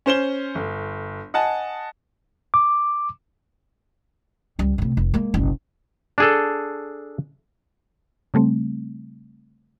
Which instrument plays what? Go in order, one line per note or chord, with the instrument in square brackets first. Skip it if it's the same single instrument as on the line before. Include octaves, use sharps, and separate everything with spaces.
[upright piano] C#4 C5 E7 G7
G1
D#5 F#5 G#5 A5
[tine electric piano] D6
[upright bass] C#2 G3
A2 C3
F1
G#3 A#3
F#1 B1
[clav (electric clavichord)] D4 G#4 A4
[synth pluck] C#3 G3 A3 C4